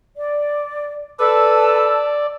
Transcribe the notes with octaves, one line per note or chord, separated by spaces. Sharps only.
D5
A4 B4 D5 A5 E6